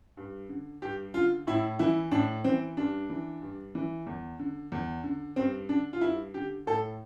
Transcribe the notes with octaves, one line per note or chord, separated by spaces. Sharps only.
G2
D3
G2 G4
D3 F4
A2 E4
E3 E4
A2 D4
E3 C4
G2 D4
E3
G2
E3
E2
D3
E2
D3
G2 C4
D3 D4
F4
G2 E4
D3 G4
A2 A4